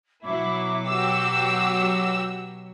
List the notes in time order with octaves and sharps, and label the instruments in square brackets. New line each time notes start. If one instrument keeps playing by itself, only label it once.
[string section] B2 F#3 [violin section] E4 [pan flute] D6
[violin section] F#4 G4 E6